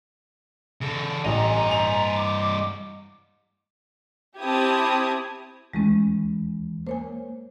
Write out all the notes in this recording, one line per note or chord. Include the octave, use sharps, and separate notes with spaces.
C#3 A4
A1 G2 D#5 G#5 A#5
F7
D6
C4 E4 G4 A5 D#6 G#6
D#2 E3 G#3 A3 C#4
A#3 C5 C#5 G#5